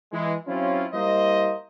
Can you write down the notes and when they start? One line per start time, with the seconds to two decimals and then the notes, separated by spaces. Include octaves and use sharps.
0.13 E3 G#3
0.48 F#3 C4 C#4 E4 F4
0.94 G3 A#3 E4 C5 D#5